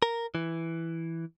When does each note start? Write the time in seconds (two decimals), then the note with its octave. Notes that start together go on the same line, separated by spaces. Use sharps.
0.02 A#4
0.35 E3